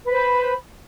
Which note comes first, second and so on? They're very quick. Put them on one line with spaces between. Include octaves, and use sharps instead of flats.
B4 C5 B5